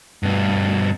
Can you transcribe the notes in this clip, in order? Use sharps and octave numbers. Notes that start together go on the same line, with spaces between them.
G2 B2